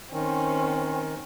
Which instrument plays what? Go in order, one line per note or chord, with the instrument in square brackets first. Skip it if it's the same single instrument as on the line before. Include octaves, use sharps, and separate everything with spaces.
[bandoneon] D#3 [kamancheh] C4 C#4